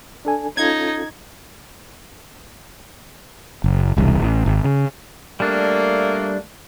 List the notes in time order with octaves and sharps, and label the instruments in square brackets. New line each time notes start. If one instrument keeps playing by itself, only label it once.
[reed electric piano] D4 A4 G#5
[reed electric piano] C#4 F4 A4 [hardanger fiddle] D#4 [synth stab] G#6
[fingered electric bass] F#1
E1 C2
A1
G#1
C#3
[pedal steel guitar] G3 D4 [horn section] A3 A#3